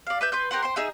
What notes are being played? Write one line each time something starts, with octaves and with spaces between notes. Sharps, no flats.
D5 F5
B4 E5 G6
B4 C6 G6
G4 A#4 C5 F#5
C5 G5 C6
D#4 G#4 E5